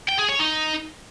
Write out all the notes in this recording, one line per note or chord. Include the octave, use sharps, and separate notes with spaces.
G5
G#4
C#5
D#4